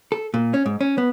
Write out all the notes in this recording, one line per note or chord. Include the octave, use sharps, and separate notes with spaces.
A4
A#2
C#4
G#2
C#4
B3